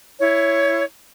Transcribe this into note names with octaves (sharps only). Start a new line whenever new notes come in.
E4 C#5